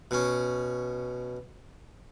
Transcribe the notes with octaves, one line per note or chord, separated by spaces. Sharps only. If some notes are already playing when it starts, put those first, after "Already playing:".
B2 C#4